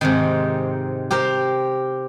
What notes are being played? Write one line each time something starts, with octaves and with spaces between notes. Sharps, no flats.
G#2 C3 D#3
G4 A#4 C5